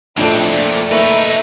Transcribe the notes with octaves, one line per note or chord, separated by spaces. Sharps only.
A#1 F2 A2 A3 C4 D4 A4
A#2
A#3 D#4 B4 E5 C#6 C#7